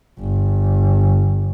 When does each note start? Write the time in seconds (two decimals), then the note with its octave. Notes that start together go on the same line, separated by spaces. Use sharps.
0.19 G1